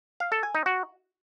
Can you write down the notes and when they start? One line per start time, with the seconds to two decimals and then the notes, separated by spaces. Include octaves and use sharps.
0.20 F5
0.32 A4
0.43 G#5
0.55 D#4
0.66 F#4